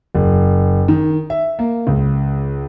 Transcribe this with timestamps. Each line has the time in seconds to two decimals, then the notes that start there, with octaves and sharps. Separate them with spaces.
0.15 F#1
0.88 D#3
1.30 E5
1.59 A#3
1.87 C#2